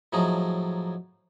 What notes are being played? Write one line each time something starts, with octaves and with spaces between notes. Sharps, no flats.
A2 F3 F#3 D#4 G#4